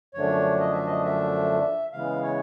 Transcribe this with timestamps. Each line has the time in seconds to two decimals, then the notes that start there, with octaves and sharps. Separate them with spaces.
0.14 F#2 D3 F3 A3 D4 C#5
0.59 D#5
0.73 E5
0.86 D#5
1.04 E5
1.93 C#3 E3 G#3 B3 F5
2.23 C#5